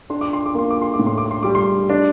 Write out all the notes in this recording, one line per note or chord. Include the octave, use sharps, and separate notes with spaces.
D4 C6
D6
C6
D6
A#3 C6
D6
C6
D6
A2
C6
D6
C6
G3 D6
C6
D4